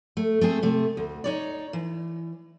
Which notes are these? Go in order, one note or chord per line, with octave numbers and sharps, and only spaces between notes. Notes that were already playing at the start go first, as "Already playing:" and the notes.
A3
A3 C4 G#4
C3 A3
D2
D#4 C#5 D5
E3